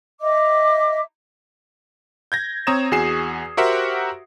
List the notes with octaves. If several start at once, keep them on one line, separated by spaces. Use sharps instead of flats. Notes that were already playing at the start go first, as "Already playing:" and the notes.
D#5 E5 D6
G6 G#6 A#6
C4 C#5 A#5 D#6 G#6 E7
E2 F#4 G#4 G#5 C7 E7
F#4 G4 A#4 C5 E5 F#5